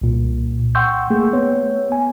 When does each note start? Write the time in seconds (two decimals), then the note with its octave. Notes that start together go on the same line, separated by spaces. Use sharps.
0.02 C2 A#2
0.75 F#5 G5 C6 C#6 E6 G6
1.10 A3 A#3 G#4
1.33 B3 C#5
1.92 G#5